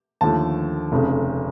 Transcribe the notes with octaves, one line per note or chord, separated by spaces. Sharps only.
D#2 D3 F3 A3 A5
F1 F2 C#3